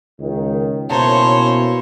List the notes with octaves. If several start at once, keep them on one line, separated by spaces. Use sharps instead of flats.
C#2 D#3
B2 A#3 C#4 E4 C5 C#5 A5 A#5